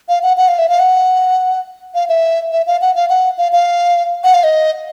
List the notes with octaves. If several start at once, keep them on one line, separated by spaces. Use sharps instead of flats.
F5
F#5
F#5
F5
E5
F5
F#5
F5
E5
E5
F5
F#5
F5
F#5
F5
F5
F#5
F5
D#5